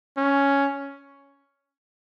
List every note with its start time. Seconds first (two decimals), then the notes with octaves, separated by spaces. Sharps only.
0.17 C#4